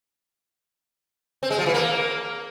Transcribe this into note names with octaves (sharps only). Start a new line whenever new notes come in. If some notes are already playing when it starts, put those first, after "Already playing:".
C4
G#3
F3
E3
A#3